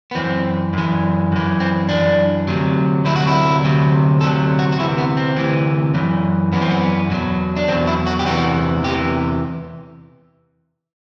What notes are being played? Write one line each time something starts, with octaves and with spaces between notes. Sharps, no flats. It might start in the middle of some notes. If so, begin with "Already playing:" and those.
B3
F#2 E3 C4
F#2 E3
F#2 E3
C4
F#2 E3 D4
D2 C3 F#3
D2 C3 F#3 E4
F#4
E4
D2 C3 F#3
D2 C3 F#3 A4
F#4
F#4
D2 C3 E3 E4
B3
C4
D2 C3 E3
F#2 E3
F#2 E3 B3
C4
B3
E2 B2 F#3
D4
E2 B2 F#3 C4
E4
F#4
G4
E2 C3 E3 F#4
E2 C3 E3 G4